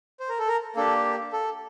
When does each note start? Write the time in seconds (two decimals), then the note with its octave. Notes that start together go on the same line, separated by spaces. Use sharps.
0.20 C5
0.29 A#4
0.39 A4
0.48 A#4
0.76 A#3 D4 G4 A4
1.33 A4